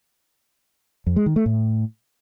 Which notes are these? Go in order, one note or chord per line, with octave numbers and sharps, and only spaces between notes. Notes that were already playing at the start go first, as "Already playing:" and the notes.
F2
G#3
D#3
A3
A2